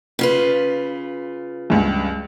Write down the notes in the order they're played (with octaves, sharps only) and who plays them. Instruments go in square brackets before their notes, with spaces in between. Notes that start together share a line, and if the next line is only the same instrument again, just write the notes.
[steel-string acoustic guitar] C#3 F4 B4
[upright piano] C#2 G2